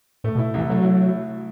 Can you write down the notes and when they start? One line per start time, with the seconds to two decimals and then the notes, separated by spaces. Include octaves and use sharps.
0.24 A2 A3
0.35 B2
0.39 E4
0.54 C2 E3
0.69 F#3 A3
0.84 E4